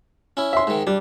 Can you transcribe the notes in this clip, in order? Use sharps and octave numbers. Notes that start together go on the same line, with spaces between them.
C#4 E4
E5 C6
G#2 D#3
G3 D4